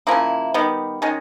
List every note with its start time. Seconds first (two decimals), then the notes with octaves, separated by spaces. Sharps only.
0.07 C#3 F3 A#3 E4
0.54 D#3 G3 B3
1.02 D#3 G#3 C#4